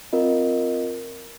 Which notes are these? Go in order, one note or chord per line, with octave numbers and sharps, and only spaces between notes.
C4 F4 A#4 D#5